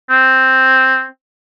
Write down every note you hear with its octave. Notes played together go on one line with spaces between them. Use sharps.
C4